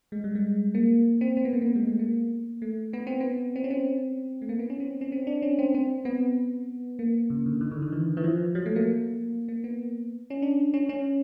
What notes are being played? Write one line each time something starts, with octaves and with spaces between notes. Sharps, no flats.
G#3
G3
G#3
A#3
C4
C4
B3
A#3
B3
G#3
A3
A#3
A3
B3
C4
B3
C4
C#4
C4
A3
A#3
B3
C#4
C4
C#4
C4
D4
C#4
C4
C4
B3
A#3
C#3
D3
D#3
D3
D#3
E3
E3
F3
F#3
A3
A#3
A#3
B3
C#4
D4
C#4
C#4